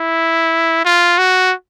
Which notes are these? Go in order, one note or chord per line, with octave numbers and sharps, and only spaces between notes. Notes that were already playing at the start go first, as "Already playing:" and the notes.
Already playing: E4
F4
F#4